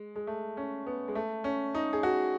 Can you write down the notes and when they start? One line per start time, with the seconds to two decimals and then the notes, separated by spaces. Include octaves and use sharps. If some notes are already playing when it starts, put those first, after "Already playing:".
Already playing: G#3
0.16 G#3
0.27 A3
0.57 C#4
0.86 B3
1.08 G#3
1.15 A3
1.44 C#4
1.75 D#4
1.93 G#4
2.03 F#4